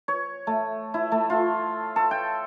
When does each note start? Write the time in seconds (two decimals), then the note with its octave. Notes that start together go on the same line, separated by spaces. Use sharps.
0.08 C#5
0.47 A3
0.94 E4
1.12 A3
1.30 F4
1.96 A4
2.11 G5